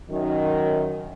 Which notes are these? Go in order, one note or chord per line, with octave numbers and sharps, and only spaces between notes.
F#2 D#3